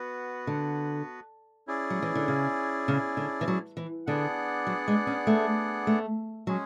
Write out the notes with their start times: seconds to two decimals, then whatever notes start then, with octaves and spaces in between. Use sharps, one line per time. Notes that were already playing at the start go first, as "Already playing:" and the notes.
Already playing: B3 F#4 B4
0.47 D3
1.67 C#4 E4 G#4 D5
1.90 F#3
2.02 E3
2.15 D3
2.28 C#3
2.88 C#3
3.17 D3
3.41 E3
3.48 F#3
3.77 E3
4.07 D3 B3 D4 G#4 D5 F#5
4.67 F#3
4.88 G#3
5.07 C#4
5.27 A3
5.87 A3
6.47 F#3 G#3 C#4 G#4